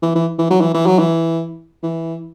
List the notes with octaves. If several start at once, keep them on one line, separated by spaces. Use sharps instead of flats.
E3
E3
E3
F#3
E3
E3
F#3
E3
E3